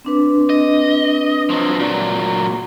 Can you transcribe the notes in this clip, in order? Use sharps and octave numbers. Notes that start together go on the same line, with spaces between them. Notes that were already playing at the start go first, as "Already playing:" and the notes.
C4 D4 B4
D#5
F3 F#3
A#2 F#3